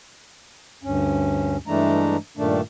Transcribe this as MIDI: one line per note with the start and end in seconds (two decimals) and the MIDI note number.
0.83 1.57 38
0.83 1.57 43
0.83 1.57 61
1.67 2.17 43
1.67 2.17 52
1.67 2.17 56
1.67 2.17 57
1.67 2.17 62
1.67 2.17 82
2.37 2.61 43
2.37 2.61 46
2.37 2.61 51
2.37 2.61 57
2.37 2.61 62